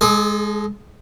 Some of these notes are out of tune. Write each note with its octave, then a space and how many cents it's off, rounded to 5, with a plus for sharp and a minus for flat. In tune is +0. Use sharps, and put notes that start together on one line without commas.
G#3 +0 A4 -45 D#6 -30